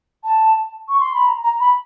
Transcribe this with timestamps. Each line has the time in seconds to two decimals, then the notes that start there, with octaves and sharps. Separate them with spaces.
0.24 A5
0.88 C#6
1.00 C6
1.14 B5
1.26 A#5
1.44 A#5
1.60 B5